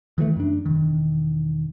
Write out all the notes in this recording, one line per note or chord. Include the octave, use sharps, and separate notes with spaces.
D#3 E3 G3 A3
F#2 D4
E1 D#3